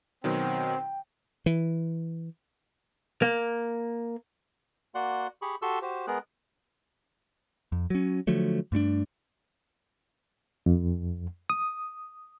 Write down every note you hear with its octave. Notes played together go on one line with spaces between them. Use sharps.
B2 D#3 F#3 C4 G5
E3
A#3
A#3 F#4 D5 F#5 C6
G4 G#4 B5 C#6
F#4 G4 A4 C6 C#6 E6
F#4 G4 C5
G#3 B3 G#4 A#4 F#6
F2
F#3 C#4
D3 F3 F#3 A3
G2 A3 C#4 D4
F2
D#6